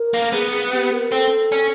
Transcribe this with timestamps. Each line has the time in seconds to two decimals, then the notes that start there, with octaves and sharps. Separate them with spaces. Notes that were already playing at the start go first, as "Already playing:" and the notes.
Already playing: A#4
0.14 A#3
0.33 B3 G#4
0.72 G4
0.93 A#4
1.12 C4 A4
1.52 C#4